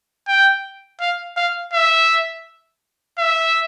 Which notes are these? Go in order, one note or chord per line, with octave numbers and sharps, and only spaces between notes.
G5
F5
F5
E5
E5